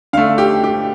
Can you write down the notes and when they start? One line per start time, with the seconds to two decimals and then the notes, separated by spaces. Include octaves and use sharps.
0.13 D3 F5
0.17 A3
0.38 G4
0.64 G4